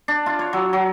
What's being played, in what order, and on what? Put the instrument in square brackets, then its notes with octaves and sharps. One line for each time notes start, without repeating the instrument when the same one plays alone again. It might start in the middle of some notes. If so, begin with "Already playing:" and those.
[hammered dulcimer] D4
F4
C#5
F#3
F#3